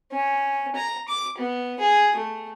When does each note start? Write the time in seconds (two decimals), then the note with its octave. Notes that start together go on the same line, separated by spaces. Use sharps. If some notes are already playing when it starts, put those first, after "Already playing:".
0.12 C#4
0.76 A#5
1.08 D6
1.38 B3
1.80 G#4
2.16 A3